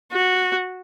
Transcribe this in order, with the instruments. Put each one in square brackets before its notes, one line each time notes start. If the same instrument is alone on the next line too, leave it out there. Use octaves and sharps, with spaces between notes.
[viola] F#4